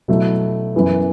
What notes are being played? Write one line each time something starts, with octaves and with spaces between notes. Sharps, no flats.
B2 F#3 A3 E4
F#2 E3 B3